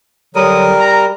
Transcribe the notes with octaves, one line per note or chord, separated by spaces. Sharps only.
D3 F#3 G3 A#4 D#6
A#5